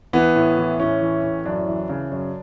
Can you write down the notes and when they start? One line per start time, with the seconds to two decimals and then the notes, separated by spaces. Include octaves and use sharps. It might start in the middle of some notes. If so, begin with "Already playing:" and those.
0.13 E3 B3
0.36 A2
0.58 E3
0.80 A2 C#4
1.01 E3
1.23 A2
1.45 F#2 D4
1.67 E3
1.89 C#3
2.11 F#2